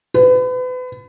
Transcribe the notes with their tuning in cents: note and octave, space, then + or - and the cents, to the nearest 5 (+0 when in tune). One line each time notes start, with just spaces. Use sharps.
B4 +35